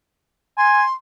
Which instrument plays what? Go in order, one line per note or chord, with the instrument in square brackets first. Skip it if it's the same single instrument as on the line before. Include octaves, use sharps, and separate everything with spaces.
[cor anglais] G#5 [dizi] C6